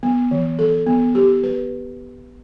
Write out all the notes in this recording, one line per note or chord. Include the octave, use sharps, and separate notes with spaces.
B3
E3
A4
B3
G4
B4